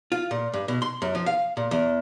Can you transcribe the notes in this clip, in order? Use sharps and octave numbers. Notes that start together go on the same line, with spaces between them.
F4
A#2
G2
B2
C6
F#2
F3
F5
A#2
E2